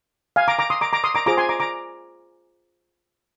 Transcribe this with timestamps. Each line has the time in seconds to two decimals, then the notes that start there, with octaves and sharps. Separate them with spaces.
0.36 F5 G#5
0.48 A#5 D6
0.59 A#5 D6
0.70 C6 D#6
0.81 A#5 D6
0.93 A#5 D6
1.04 C6 D#6
1.15 A#5 D6
1.26 F4 G#4 C5 A#5 D6
1.37 G#5 C6
1.49 A#5 D6
1.60 A#5 D6